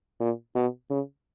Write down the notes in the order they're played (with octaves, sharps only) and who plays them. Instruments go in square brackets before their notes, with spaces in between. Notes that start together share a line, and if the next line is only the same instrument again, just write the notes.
[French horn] A#2
B2
C#3